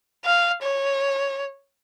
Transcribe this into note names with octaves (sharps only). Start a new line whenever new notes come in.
F5
C#5